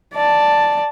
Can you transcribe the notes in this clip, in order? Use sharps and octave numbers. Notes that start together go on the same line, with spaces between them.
D5 A5